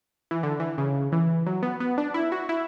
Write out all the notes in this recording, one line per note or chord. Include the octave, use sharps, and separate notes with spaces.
E3
D3
E3
C#3
E3
F#3
B3
B3
D4
E4
F#4
E4